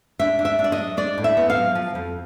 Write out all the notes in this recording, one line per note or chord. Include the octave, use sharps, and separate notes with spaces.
D4 E5
D4
E5
D4
D5
D#5
F#3
D4 D5
A2
E5
B3
F5
F#3
F3
F2